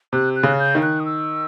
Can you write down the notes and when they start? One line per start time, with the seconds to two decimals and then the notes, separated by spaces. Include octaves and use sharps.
0.13 C3 F#6
0.36 F#6
0.43 C#3
0.60 G6
0.75 D#3
0.82 F#6
1.00 D#6
1.05 E6